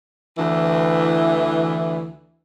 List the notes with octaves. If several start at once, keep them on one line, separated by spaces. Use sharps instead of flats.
D2 E3